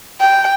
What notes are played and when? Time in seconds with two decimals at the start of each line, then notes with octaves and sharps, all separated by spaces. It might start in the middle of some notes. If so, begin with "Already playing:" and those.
0.20 G5